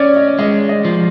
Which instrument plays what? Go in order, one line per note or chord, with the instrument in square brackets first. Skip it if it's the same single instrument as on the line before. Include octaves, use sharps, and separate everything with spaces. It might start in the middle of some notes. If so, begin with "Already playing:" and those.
Already playing: [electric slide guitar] C#4 [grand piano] D5
[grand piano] D#5
[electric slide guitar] G#3 [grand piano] D#5
[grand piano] D#5
[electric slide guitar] F3